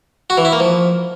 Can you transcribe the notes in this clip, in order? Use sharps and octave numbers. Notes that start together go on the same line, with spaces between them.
F#4
E3
E4
A#3
F3